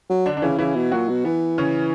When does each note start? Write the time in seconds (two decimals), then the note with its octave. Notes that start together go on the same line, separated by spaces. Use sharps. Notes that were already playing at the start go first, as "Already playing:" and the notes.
0.09 F#3
0.26 D3 D4
0.37 D4
0.42 C#3 E3 E4
0.58 C#3 E3 E4
0.76 B2
0.92 A#2 F#3 F#4
1.09 B2
1.25 E3 B3
1.58 C#3 C#4